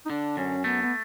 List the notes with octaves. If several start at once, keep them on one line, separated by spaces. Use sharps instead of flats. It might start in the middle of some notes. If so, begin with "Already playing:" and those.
D#4
D3 D4
F#2 C#4
A3 B3
B3